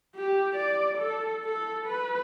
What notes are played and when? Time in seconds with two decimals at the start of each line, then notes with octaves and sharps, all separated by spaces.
0.15 G4
0.56 D5
0.97 A4
1.45 A4
1.86 B4